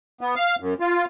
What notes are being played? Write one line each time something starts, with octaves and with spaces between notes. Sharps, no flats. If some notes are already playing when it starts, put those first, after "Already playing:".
B3
F5
F#2
F4